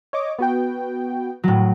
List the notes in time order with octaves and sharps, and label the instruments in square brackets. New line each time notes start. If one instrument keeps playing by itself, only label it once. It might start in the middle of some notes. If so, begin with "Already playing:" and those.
[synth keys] C#5 D#5 D6
B3 F#4 G5
[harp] A2 F#3